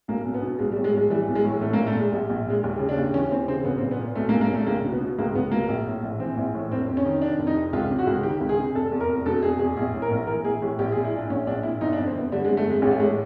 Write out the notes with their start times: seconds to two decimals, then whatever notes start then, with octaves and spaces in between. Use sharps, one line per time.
0.08 B1 A#3
0.25 B1
0.34 B3
0.42 B2
0.59 B1 G#3
0.72 G3
0.76 A2
0.84 G#3
0.93 B1
0.98 G#3
1.10 E3 G3
1.28 B1
1.35 G#3
1.44 A2
1.61 A#1 A3
1.73 A#3
1.78 A#2
1.87 A3
1.95 A#2 G#3
2.12 A#1 G3
2.30 A#1
2.47 A#2 G#3
2.63 D#2 G#3
2.79 C#3
2.89 D4
2.98 D#2
3.14 E3 C#4
3.31 D#2 C4
3.48 C#3 C4
3.65 B1 B3
3.78 C4
3.81 A#2
3.91 B3
3.99 A#2
4.15 B1 A3
4.29 A#3
4.34 B1
4.41 A#3
4.51 A#2 A3
4.67 C#2 A#3
4.85 B2
4.93 B3
5.00 B2
5.19 C#2 A#3
5.35 C#2 B3
5.52 B2 A#3
5.68 A#1
5.86 A2
6.03 A#1
6.19 E3 C4
6.37 A#1
6.54 A2
6.71 F1 C4
6.87 F2
6.97 C#4
7.05 D#3
7.21 C3 D4
7.38 F1
7.47 D#4
7.56 F2
7.73 C#2 F4
7.90 C3
7.99 F#4
8.07 C#2
8.23 D#3 G4
8.41 C#2
8.49 G#4
8.58 C3
8.74 F1 A4
8.91 E2
9.00 A#4
9.09 F1
9.26 B2 A4
9.42 F1 G#4
9.59 E2 G#4
9.77 A#1 G#4
9.94 A2
10.02 A#4
10.10 A#1
10.27 E3 A#4
10.44 A#1 G#4
10.62 A2 G4
10.79 A#1 G4
10.92 G#4
10.96 A#2
11.05 E4
11.12 A#2 D4
11.30 A#1 C#4
11.47 A#1 D4
11.63 A#2 E4
11.81 G1 D#4
11.93 D4
11.98 F2
12.06 C4
12.15 G1 B3
12.32 D3 G3
12.44 G#3
12.49 G1
12.57 A3
12.65 F2 G#3
12.82 A1 G#3
12.91 A3
13.00 A2 G#3